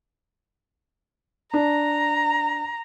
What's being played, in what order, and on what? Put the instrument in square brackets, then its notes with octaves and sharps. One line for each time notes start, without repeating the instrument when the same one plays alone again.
[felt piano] D4 [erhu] A#5